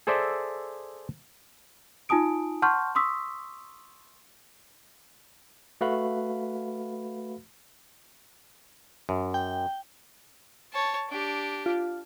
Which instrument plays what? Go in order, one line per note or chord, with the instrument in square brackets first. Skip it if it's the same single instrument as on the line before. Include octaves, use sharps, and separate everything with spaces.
[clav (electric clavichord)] G#4 A4 C5 D5 E5
[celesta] D#4 F4 G#5 A5 D#6 D7
F#5 A5 C6 C#6 F6 G6
C6 C#6 D#6 E6 B6
[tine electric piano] A3 F#4 B4 F5 B5
[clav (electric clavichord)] F#2
[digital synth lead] G5
[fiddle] C#5 A5
D4 G4
[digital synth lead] F4